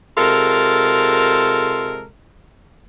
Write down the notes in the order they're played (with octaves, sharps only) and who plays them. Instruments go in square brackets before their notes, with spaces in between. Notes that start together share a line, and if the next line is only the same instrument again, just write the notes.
[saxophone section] C3 G#3 F4 A4 A#4